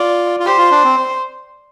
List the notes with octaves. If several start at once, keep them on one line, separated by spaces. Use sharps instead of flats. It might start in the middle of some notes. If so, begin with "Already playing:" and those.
Already playing: F4 D5
F4
G4 C5
F4
D4
C4